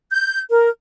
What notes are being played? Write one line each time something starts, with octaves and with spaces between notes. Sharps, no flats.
G6
A#4